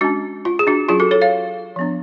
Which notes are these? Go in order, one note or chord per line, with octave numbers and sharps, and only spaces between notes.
G#3 C#4 D4 F#4
F4
G#4
D4 F#4
F#3 C#4 F4 G#4
F#4 A4
A4 C#5
C#5 F5
F3 B3 D4